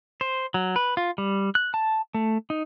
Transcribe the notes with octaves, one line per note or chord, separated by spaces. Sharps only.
C5
F#3
B4
F4
G3
F#6
A5
A3
D#4